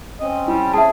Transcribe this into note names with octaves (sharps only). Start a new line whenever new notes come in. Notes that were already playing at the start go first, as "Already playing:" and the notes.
C4 C#4 D#5
G3 E4
G#4 E5 A5